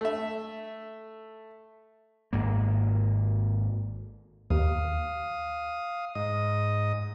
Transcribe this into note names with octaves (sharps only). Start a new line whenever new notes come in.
A3 E5
G#1 G#2 A#3
D#2 F5 D#6
G#2 D#5 D#6